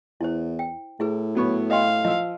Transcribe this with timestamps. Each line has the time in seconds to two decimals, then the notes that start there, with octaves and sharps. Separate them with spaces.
0.21 E2 E4 C5
0.59 G5
1.00 A2 E4 G#4 B4
1.35 F#3 B3 C#5
1.71 D#5 F5 G5 C6
2.05 F3 D#5 E6